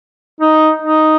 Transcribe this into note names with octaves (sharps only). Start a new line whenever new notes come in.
D#4
D#4